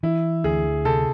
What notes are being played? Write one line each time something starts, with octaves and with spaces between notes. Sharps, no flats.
E3 E4
D2 G#4
C3 A4